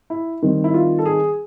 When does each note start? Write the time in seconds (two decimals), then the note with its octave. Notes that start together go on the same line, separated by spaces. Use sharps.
0.10 E4
0.43 D#3 G3 C4
0.64 E4
0.74 F4
0.98 A4
1.05 G#4